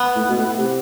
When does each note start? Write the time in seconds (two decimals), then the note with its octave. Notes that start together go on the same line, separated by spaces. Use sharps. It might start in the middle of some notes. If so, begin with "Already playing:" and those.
Already playing: B3
0.15 A2
0.29 B2
0.37 A2
0.58 C3